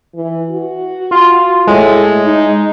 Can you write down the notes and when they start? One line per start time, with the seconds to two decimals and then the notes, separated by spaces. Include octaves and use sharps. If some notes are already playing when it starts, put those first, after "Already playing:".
0.15 E3
0.51 F#4
1.11 F4
1.67 A2 G#3
2.25 D#4